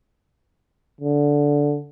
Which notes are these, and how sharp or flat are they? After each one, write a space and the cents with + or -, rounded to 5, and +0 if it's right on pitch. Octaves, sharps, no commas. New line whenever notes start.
D3 -10